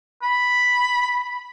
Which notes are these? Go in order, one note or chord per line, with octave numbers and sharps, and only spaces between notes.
B5